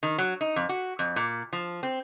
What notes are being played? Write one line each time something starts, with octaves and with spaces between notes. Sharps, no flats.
D#3
F#3
D#4
F2
F#4
F2
A#2
F3
C4